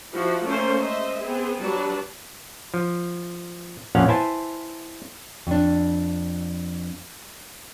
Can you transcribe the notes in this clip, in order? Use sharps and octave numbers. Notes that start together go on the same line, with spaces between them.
F3 E4 F#4
A3 A#3 C#4 C5
G#3 C5 D#5 E5
B3 C4 G#4
F#3 G3 D4 B4 A5
F3
A#1 F2 A#2 C#4 F5 F#5
E4 B4 C5 G#5 A5
F2 D4